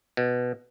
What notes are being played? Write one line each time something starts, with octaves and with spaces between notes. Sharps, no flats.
B2